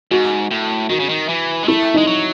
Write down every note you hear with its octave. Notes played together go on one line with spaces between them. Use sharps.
G#2 F#4
A2
D#3 F#4
C#3
D#3
E3
G#3
A3 E4
G#3 D#4
F#3